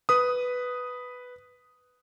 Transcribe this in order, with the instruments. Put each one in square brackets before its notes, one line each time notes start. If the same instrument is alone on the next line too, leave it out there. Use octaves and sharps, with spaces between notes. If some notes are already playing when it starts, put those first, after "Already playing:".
[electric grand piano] B4 D#6